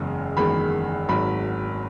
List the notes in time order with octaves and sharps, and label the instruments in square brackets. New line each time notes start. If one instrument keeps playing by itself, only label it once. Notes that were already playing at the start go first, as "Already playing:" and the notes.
Already playing: [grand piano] F#1 E2 C#3 G#3
F#1 E2 D#3 G#3 B5
G#1 G#2 F#3 B5